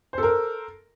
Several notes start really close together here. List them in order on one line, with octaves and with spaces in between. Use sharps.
C5 A4 A#4